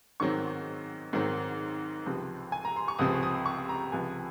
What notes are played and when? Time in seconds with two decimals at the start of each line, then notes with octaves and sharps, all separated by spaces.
0.20 G#2 D#3 F#3 C4 C#6
1.13 G#2 D#3 F#3 C4
2.06 C#2 C3 F3 C4
2.52 G#5
2.65 A#5
2.76 C6
2.88 C#6
2.99 C#2 C3 F3 C4 D#6
3.23 D#6
3.46 C#6
3.69 A#5
3.92 C#2 C3 F3 G#5